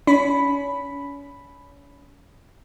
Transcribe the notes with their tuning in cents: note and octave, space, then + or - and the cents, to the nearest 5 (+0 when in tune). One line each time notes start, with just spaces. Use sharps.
C#4 +35 B5 +0